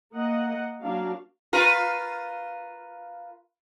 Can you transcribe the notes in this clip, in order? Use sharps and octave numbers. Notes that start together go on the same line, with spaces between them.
A#3 D#5 F#5
F#3 A#3 D4 F#4 F5
F4 A#4 B4